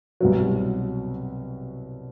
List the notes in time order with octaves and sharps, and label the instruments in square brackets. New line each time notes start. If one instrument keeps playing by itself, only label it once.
[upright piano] C2 B2 F#3